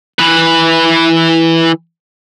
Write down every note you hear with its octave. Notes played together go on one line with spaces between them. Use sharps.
E3 B4